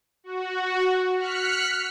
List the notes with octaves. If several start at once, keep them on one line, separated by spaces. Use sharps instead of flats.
F#4
F6 F#6 B6 C#7